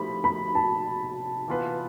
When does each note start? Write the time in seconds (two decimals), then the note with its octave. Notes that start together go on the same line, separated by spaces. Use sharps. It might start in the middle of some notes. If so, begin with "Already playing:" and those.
Already playing: F3 A3 C4 E4 G4 B5
0.24 B5
0.55 A5
1.48 E3 B3 F4 B4